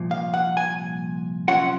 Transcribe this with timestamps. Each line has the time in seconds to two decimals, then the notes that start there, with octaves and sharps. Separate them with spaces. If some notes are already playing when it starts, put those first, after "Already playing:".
Already playing: C2 A#2 F3
0.11 F5
0.34 F#5
0.57 G#5
1.48 C3 F#3 C#4 F4 F#5